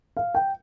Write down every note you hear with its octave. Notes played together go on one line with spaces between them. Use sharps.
F5
G5